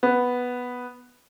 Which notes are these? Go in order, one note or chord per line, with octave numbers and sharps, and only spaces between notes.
B3